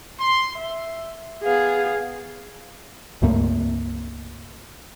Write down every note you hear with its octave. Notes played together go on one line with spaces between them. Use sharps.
C6
E5
B3 G#4 F5
C#2 G2 A3 A#3